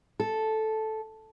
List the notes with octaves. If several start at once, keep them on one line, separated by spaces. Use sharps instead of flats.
A4